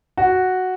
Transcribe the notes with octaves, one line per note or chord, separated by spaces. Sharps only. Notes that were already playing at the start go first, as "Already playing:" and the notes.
F#4